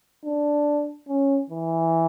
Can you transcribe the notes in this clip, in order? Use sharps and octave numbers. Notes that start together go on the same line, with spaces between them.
D4
C#4
E3